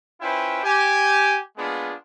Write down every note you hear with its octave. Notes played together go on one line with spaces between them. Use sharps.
C#4 E4 F4 B4 C5 G5
G4 G#5
G#3 A#3 B3 D4 F4 G#4